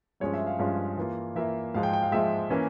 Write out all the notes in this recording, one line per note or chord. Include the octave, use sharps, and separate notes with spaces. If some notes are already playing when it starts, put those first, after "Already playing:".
G2 F3 G#3 C#4 F4 C#5
E5
F5
G2 F3 G#3 C#4 F4 C#5
E3 A#3 F4
E3 A#3 F4 E5
G#2 F3 G#3 F5
G5
G5
F5
G#2 F3 G#3 E5
E3 A#3 C#4